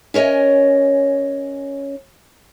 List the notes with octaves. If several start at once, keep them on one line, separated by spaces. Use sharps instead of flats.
C#4 A#4 C#5 D#5 G#5